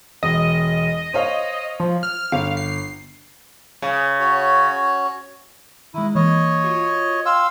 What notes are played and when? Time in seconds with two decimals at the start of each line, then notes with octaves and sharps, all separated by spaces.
0.23 E1 D#5
1.13 C5 C#5 F5
1.80 F3
2.03 F6
2.32 G1 F5
2.57 C7
3.82 C#3
4.20 C#4 F#4 C#5
5.94 D#3 G#3 E4
6.15 E3 A#3 C#5 D#5
6.64 F4 F#4
7.26 F5 G5 C6 E6